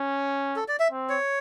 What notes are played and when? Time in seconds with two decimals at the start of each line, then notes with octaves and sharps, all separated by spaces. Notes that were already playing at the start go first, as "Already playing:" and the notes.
Already playing: C#4
0.56 A4
0.68 D5
0.80 E5
0.91 C4
1.09 C#5